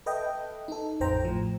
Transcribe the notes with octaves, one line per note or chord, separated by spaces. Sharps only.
A4 B4 D#5 E5 G5
D#4 A4
A1 F2 C5 G5 A#5
A2 F3